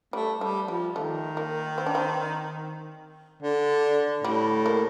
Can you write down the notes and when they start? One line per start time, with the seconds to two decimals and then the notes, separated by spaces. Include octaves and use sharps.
0.13 G3 A3
0.41 G3 A3
0.68 F3 G3
0.95 D#3 A3
1.37 A#3
1.78 C4
1.86 D4
1.95 C4
3.42 D3
4.24 A2 G3
4.66 A#3